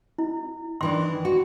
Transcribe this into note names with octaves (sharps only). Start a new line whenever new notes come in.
E4
D#3 E3 D4 C6
F#4